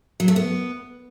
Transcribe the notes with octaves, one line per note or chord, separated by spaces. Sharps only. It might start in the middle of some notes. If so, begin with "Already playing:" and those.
F#3
A3
B3